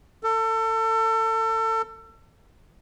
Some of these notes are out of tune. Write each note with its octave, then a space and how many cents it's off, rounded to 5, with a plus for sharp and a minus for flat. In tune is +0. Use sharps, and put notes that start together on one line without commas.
A4 +30